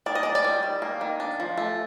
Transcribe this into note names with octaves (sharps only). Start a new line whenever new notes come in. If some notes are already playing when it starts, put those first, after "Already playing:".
D#3 D5
D#5
D#3 D5
D5
G3
D#3
A#3
D#3
D4
F3
A3